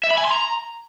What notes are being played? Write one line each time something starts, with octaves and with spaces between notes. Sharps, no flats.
E5
B5
G#5
C6
A#5